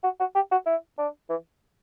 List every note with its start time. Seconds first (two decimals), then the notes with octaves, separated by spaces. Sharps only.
0.03 F#4
0.20 F#4
0.35 G4
0.51 F#4
0.66 E4
0.98 D4
1.29 E3